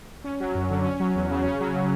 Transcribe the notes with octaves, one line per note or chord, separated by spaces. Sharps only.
C#4
F#3
F#2
D3
C#4
F#3
E2
C#3
C#4
F#3